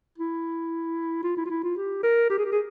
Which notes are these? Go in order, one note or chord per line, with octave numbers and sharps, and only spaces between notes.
E4
F4
E4
F4
E4
F4
G4
A#4
G4
G#4
G4
G#4